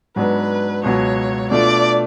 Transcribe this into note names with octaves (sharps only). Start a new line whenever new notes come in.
G#2 F#3 B3 D4 B4
C#2 B2 F#3 C#5
B2 A3 D4 F4 D5